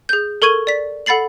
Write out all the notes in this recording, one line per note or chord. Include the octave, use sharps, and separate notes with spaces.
G#4 G6
A4 A#4 C#6 G#6 D#7 G7
D5 B6
A4 F#5 B5 A6 C7 F#7